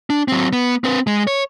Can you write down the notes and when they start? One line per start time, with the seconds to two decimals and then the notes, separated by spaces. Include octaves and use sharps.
0.10 D4
0.28 F#3 C4
0.53 B3
0.84 C4 B4
1.07 G#3
1.27 C#5